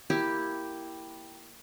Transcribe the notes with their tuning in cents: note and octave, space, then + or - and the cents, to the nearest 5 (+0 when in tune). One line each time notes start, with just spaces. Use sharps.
A#3 +0 E4 +0 G4 +0